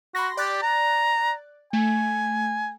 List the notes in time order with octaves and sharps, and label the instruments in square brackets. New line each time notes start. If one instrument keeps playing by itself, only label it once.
[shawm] F#4 [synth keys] B5 C6 A#6
[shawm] G4 [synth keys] D5 F#6 A6
[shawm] A#5
[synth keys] A3 [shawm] G#5